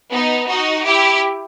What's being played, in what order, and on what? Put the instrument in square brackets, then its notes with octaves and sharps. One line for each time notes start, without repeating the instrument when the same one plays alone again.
[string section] B3 D#4
D#4 F#4
E4 G4